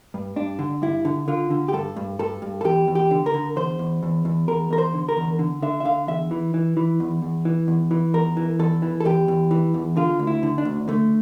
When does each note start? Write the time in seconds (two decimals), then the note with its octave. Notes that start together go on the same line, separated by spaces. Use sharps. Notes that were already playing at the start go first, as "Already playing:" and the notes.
0.14 G2
0.36 G2 D4
0.59 D3
0.82 G2 E4
1.05 D3
1.28 D3 F4
1.50 D3
1.68 G4
1.73 G2 A4
1.96 G2
2.19 G2 A4
2.42 G2
2.61 A4
2.64 E2 G4
2.88 E2
2.95 G4
3.11 D3
3.26 A#4
3.34 D3
3.56 E2 C5
3.79 E2
4.03 E2
4.25 E2
4.48 E2 A#4
4.70 E2 A#4
4.78 C5
4.94 D3
5.09 A#4
5.17 E2
5.39 D3
5.62 D3 E5
5.80 E5
5.85 D3 F5
6.07 E2 E5
6.31 E3
6.54 E3
6.77 E3
7.00 E2
7.22 E2
7.45 E3
7.68 E2
7.91 E3
8.14 E2 A#4
8.37 E3
8.59 E2 A4
8.82 E3
9.00 A4
9.05 E2 G4
9.28 E2
9.51 E3
9.74 E2
9.97 D3 F4
10.19 D2
10.27 E4
10.43 D3
10.58 D4
10.65 D2
10.88 D3 A3